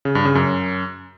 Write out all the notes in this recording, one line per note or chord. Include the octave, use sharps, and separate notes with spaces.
C#3
G2
C#3
F#2